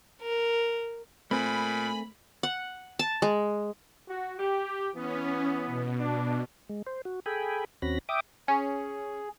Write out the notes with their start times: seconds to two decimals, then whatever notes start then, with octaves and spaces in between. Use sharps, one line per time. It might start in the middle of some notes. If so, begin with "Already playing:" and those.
0.21 A#4
1.31 A#2 A3 C4 A#4 G#5 B5
2.43 F#5
2.99 A5
3.22 G#3
4.08 F#4
4.39 G4
4.95 E3 B3 C#4
5.67 B2
6.00 D4
6.69 G#3
6.87 C5
7.05 F#4
7.26 G#4 A4 G5 G#5 B5
7.82 D#2 C4 C#4 F#4 B5 A#6
8.09 E5 G5 D6 D#6
8.48 C#4 G#4